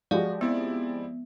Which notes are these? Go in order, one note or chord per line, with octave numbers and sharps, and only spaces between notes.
F3 G#3 F#4 G4 D5 F5
B3 C4 E4 D5